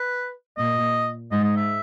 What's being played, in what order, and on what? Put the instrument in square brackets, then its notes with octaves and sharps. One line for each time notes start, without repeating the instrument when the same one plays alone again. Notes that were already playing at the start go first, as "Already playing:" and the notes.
Already playing: [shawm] B4
[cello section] A#2 [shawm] D#5
[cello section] G#2 [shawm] D#5
[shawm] D#5
E5